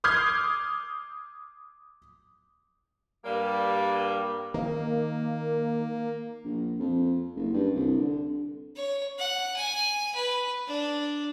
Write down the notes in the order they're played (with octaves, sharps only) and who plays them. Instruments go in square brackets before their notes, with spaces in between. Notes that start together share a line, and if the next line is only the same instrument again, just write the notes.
[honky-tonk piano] D6 D#6 F6 G6 G#6 C7
[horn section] G2 G3 A#3
[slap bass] D#3 [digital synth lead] A#3
[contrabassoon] A#1
F2
F#1
G2
C2
D3
[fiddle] C#5
F#5
G#5
B4
D4